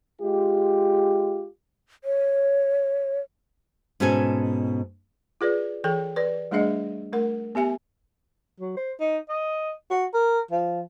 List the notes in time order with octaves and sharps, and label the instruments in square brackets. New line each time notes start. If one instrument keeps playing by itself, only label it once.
[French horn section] G#3 F4 G4
[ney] C#5
[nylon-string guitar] G#2 B2 C#4 A4 G#5
[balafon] F4 G#4 B4 D5
E3 G#4 A4 G5
B4 D5
G3 A3 D4 G#4 D#5 E5
A3 A#4 F#5
B3 G4 E5 G#5
[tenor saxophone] F#3
C5
D#4
D#5
F#4
A#4
F3